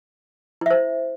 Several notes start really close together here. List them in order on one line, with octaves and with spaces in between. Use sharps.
E4 E5 C5